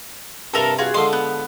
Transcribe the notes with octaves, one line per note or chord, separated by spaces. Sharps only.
G2 C3 A4 A#4
F4 F#4 G#4
D3 F3 G#3 C6
B3